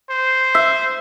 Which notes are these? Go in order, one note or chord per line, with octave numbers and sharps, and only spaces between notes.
C5
E5